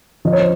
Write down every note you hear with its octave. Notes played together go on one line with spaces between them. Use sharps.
F3 D#5
C#5
C5